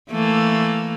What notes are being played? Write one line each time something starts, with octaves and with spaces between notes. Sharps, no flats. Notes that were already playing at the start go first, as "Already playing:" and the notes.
E3 A3 A#3